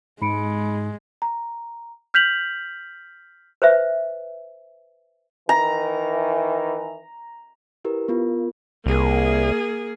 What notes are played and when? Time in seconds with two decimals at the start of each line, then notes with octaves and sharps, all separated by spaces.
0.22 G#2 G#3 B5 C#7 D7
1.22 A#5
2.14 F6 G6 B6 F7 F#7
3.62 B4 C5 E5
5.49 D#3 E3 A#5
7.85 E4 G4 A#4 B4
8.08 B3 F4 A#4
8.86 C2 A#3 G#4